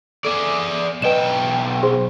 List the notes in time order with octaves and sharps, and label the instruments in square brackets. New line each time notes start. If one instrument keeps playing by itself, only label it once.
[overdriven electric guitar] G#4 D5 [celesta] A4
[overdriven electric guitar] B1 G5 [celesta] B4 D#5 E7
[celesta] G#4 C5 C6